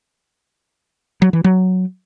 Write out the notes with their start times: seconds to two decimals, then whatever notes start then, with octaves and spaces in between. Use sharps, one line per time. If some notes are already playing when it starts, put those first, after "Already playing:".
1.22 F#3
1.33 E3
1.44 F#3